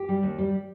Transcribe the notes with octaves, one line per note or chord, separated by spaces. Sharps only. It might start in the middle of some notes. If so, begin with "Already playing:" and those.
Already playing: G4
G3
D#2
G3